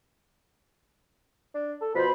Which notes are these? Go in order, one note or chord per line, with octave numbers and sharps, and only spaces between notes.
D4
A4
B2 F3 C5 B5